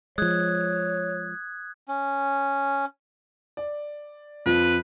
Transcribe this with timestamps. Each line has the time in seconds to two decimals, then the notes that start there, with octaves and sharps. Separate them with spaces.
0.18 F3 G#3 C#5 D#6 F#6 G#6
1.88 C#4
3.57 D5
4.46 F2 F3 F4 B4